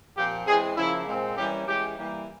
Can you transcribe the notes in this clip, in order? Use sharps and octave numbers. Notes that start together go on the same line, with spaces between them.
A#2 F3 C4 G4
E3 G#3 C4 G#4
C#3 F3 A#3 E4
A#2 G#3 C4
E3 G3 A#3 C#4 G4
E3 G#3 C#4 G4
E3 G3 A#3